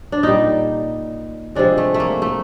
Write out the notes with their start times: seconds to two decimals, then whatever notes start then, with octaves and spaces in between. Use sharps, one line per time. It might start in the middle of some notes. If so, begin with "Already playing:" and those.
0.12 D4
0.23 A#2 G3 D#4
1.55 C3 F3 G#3 D4
1.78 A3
1.94 A3
2.00 A#3
2.22 A3